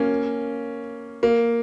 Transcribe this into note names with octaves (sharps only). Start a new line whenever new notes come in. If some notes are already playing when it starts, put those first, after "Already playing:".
Already playing: A#3 C#4
A#3